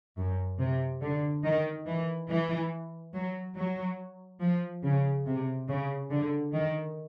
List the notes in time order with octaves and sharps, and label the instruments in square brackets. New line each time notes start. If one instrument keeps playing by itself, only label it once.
[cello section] F#2
C3
D3
D#3
E3
E3
F#3
F#3
F3
C#3
C3
C#3
D3
D#3